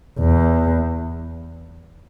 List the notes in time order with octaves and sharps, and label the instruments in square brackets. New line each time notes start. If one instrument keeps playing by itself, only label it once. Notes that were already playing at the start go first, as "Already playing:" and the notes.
[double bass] E2